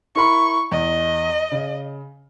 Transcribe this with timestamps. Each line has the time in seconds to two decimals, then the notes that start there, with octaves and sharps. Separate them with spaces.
0.16 E4 A#4 B5 C#6
0.72 E2 D#5
1.52 C#3